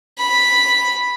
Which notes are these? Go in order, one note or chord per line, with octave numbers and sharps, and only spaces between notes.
B5